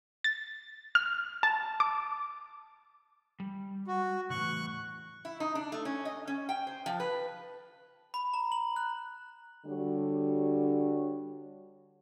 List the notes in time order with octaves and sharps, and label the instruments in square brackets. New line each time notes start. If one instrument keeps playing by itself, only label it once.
[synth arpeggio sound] A6
F6
A5
D6
[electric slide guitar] G3
[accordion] F#4
[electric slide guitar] E2 A2 C#3 [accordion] C#6 F#6
[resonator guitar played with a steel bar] E4
D#4
D4
A3
C#4
D#5
C#4
G5
C5
F3
B4
[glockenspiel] B5
A#5
F#7
F#6
[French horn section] D3 G3 D4 F#4 C#5